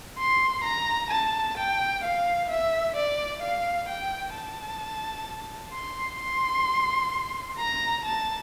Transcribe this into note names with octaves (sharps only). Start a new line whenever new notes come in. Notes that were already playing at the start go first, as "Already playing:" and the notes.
C6
A#5
A5
G5
F5
E5
D5
F5
G5
A5
C6
C6
A#5
A5